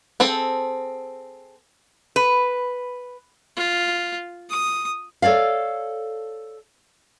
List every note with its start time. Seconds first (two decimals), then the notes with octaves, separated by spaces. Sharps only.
0.20 C4 G#4 A4
2.16 B4
3.56 F4
4.50 D#6
5.22 A4 C#5 D5 F5